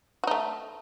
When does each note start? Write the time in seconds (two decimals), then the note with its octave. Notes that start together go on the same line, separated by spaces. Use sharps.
0.24 F#4
0.27 D#4
0.31 A3